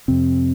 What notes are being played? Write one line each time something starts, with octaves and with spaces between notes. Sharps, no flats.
F2 C3 C4